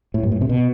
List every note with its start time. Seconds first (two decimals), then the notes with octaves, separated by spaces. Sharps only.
0.14 A2
0.23 G2
0.32 A2
0.41 C3
0.49 B2